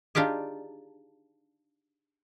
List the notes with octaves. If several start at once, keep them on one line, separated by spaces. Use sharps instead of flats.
D4 D#4 F4 G4 G#4